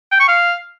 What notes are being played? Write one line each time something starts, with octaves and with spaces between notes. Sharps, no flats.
G5
C#6
F5